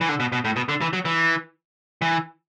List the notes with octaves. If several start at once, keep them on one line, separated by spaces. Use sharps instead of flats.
E3
D3
B2
B2
A2
B2
D3
E3
F#3
E3
E3